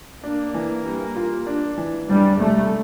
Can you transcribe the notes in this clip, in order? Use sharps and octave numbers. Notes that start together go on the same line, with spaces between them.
A#3 D4
E3
G3
F4
D4
E3
G3 D4
C3 A3